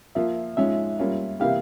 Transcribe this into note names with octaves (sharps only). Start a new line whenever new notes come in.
F3 A#3 F4 E5
G#2 F3 G#3 C#4 F4 E5
G3 A#3 C#4 F4
C3 E3 A#3 E4 G4 F5